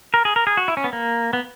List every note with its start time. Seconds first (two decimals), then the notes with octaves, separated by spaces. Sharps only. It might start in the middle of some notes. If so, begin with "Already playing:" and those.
0.14 A#4
0.25 G#4
0.36 A#4
0.47 G#4
0.57 F#4
0.68 E4
0.77 C#4
0.84 B3
0.93 A#3
1.33 B3